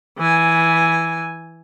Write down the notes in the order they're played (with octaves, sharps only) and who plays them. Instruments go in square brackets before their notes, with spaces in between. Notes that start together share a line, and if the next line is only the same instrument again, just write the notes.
[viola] E3 G#5